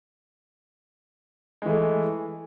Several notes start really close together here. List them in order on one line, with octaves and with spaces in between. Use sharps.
G#3 E3 A3